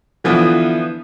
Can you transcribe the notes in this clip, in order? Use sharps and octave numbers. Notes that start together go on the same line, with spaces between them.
D3 E3 F3 B3